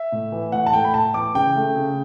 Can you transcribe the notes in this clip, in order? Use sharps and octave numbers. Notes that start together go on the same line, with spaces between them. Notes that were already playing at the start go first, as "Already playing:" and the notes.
Already playing: E5
A2
E3
A2 F#5
A5
A3 G5
B5
A2 A5
E3 D6
C#3 G5
A3
C#3